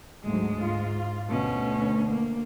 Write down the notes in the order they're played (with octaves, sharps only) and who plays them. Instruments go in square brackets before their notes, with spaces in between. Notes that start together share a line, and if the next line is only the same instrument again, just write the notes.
[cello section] D2 G#2 F#3 [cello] G#3
[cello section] G#2 F4
[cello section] D2 [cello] B2 C#4
[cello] A#3